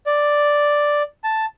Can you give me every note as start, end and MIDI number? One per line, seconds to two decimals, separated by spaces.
0.06 1.02 74
1.24 1.45 81